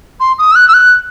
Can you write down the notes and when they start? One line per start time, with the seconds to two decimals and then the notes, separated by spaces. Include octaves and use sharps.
0.20 C6
0.39 D#6
0.52 E6
0.55 F#6
0.69 E6
0.74 F#6